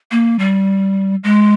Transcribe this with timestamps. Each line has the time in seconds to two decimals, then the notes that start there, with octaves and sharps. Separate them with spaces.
0.11 A#3
0.39 G3
1.24 G#3